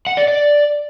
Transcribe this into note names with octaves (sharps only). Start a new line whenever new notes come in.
F#5
D5
D5